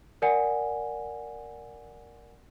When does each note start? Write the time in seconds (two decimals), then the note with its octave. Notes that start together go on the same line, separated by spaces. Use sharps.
0.22 A#4 D5 F#5 G#5